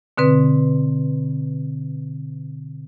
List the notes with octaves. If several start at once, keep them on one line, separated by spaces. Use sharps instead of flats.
B2 D3 C4 B4